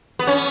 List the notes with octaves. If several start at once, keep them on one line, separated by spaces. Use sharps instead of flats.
B3
C#4